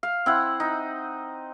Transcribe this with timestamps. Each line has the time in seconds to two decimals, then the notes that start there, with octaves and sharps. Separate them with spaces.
0.03 F5
0.26 C4 E4 F#5
0.60 D#4